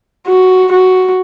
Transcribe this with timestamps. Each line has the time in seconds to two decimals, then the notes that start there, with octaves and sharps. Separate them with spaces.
0.27 F#4
0.72 F#4